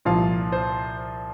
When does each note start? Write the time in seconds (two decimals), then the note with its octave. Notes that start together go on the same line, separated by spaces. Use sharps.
0.05 C2 A#2 F3 F5
0.52 C5